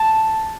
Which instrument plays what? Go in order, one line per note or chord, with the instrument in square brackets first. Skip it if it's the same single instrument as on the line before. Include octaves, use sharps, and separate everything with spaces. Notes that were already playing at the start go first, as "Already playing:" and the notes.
Already playing: [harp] A5